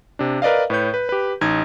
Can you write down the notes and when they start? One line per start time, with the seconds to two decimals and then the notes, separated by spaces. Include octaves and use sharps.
0.19 C3 D4
0.42 A#4 B4 D5 D#5 F5
0.70 A2 B4 C#5 G6
0.94 B4
1.09 G4 B4
1.41 A1 D#4 G#6